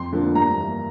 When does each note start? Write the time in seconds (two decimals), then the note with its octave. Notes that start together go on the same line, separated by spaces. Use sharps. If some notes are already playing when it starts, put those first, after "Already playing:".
Already playing: F2 C6
0.12 D3 F3 A#3
0.35 G2 A#5
0.58 E3 A#3